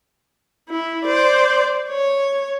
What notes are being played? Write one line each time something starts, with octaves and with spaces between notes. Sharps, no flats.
E4
C5 D5
C#5